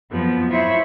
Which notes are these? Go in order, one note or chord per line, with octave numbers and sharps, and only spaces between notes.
F2 F3 F#3 B3
E4 F4 C5 C#5 E5 C#6